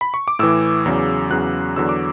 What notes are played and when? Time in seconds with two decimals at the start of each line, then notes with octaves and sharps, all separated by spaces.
0.01 B5
0.14 C#6
0.28 D6
0.39 A2 E3 E6
0.86 E2 C#3 F#3
1.30 E2 C#3 F#3 F#6
1.76 E2 D3 F#3 E6
1.89 D6